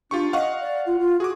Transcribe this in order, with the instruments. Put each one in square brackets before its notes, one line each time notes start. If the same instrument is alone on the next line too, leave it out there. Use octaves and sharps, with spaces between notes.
[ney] D4 [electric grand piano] F4 G4 C#6
[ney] D#5 [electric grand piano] F5 F#5 C#6
[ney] D5
F4
F4
[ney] F#4 [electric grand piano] G#4 D6